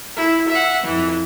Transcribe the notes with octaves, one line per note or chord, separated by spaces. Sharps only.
E4
E5 F#5
F2 E3